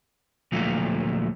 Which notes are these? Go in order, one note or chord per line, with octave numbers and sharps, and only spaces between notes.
D2 A#2 F3 F#3 A3